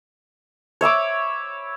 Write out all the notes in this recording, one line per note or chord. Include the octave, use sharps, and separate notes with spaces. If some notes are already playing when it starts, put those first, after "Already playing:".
C#5 E5 B5 D6